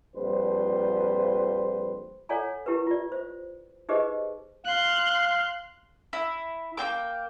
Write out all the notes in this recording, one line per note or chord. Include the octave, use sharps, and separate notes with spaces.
A#1 F2 G3 B4 C5
A4 C#5 D5 F#5 G#5 A#5
E4 G4 A#4 B4
F4 D5
C5
D#4 G4 G#4 B4 C5 D#5
F5 C6 F#6
E4
A#3 C4 G5 D6